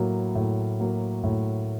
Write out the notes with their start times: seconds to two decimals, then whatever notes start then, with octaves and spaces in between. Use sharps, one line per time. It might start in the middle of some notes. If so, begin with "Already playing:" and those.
Already playing: A2 F#3 A#3
0.35 A2
0.80 F#3 A#3
1.24 A2